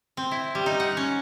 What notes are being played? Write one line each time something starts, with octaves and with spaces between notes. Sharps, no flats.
C4
E4
G3
D#4
F#5
C#4